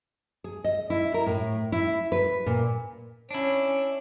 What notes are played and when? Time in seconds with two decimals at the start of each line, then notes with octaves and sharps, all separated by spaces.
0.44 G#4
0.64 D#5
0.90 E4
1.14 A#4
1.26 A2
1.72 E4
2.12 B4
2.46 A#2
3.31 C#4 D4 E4